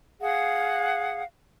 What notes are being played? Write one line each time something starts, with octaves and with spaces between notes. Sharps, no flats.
G#4 F5 F#5